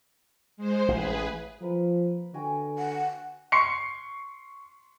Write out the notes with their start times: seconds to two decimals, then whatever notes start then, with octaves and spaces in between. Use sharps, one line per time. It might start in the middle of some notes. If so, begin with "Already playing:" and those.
0.57 G#3 C5
0.88 A1 G#4 B4
1.62 F3 A#3 B4
2.34 D3 F#4 G5 G#5
2.79 F#5
3.52 C6 C#6 C7 C#7